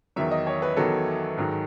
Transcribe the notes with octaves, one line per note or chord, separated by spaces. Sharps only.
E2 D#3 F#3 E5
D#5
C#5
B4
E2 D#3 F#3 A4
G#2 D#3 F#3